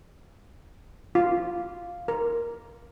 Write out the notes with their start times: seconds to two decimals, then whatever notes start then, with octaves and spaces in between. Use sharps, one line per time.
1.15 F4
2.08 A#4